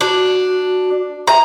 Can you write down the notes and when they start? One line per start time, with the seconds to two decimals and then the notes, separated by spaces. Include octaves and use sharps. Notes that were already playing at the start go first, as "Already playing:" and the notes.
0.01 D4 F#4
1.27 E5 A#5